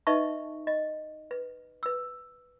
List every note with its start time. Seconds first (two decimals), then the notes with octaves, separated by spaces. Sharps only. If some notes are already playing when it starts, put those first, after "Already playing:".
0.07 D#4 B4 D#5 E5 A5 C#6
0.67 D#5
1.31 B4
1.83 B4 E6